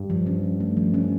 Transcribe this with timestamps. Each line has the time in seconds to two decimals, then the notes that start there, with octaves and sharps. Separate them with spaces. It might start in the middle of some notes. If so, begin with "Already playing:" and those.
Already playing: G2
0.10 F3
0.27 C#4
0.43 F3
0.60 A3
0.77 F3
0.94 C#4